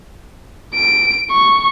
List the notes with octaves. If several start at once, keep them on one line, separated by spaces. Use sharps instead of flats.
D7
C#6